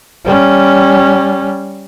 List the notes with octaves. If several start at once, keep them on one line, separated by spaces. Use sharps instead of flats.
G3 C#4